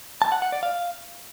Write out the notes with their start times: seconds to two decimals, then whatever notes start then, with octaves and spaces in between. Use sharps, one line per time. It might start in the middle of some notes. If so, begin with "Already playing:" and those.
0.22 A5
0.32 F#5
0.42 F#5
0.52 D5
0.63 F5